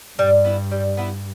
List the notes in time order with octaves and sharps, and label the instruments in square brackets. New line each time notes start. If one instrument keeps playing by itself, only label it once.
[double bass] G2 [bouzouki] G3
[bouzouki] B3 E4
G3
B3 E4